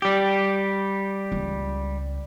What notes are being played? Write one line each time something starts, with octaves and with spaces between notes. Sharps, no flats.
G3 G4
C#2